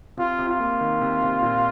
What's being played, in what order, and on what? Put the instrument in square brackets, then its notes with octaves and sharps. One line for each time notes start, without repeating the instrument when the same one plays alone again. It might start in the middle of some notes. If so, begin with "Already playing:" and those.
[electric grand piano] C3 [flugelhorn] F4
[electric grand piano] C3
[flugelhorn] F4
[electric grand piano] A#3
D#3
C3
C3
A#2